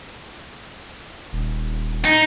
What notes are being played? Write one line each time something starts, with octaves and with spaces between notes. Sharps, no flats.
D#1
D#4